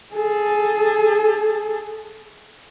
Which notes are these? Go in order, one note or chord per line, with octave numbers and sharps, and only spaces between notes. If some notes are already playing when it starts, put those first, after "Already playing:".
G#4 A4